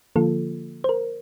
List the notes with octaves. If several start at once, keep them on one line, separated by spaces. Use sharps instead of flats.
D3 F3 A#3 F4 A4
C5
A#4